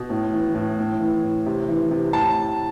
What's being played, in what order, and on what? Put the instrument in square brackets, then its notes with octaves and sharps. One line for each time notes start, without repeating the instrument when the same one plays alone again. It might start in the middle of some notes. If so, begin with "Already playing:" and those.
Already playing: [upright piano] B2
A2
E3
A2
A2
E3
A2
C3
E3
C3
A2 A5